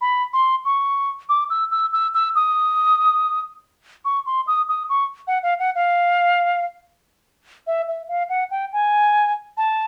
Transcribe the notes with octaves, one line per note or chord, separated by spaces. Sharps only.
B5
C6
C#6
D6
E6
E6
E6
E6
D#6
C#6
C6
D#6
D#6
C#6
F#5
F5
F#5
F5
E5
E5
F5
F#5
G5
G#5
A5